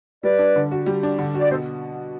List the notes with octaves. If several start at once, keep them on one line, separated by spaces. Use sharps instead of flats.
G3 B4 D5
D4
D3
F#4
G3
D4
D3
F#4 D5
B2 A4 C5